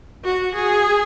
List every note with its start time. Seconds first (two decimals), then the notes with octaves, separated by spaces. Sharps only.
0.24 F#4
0.55 G#4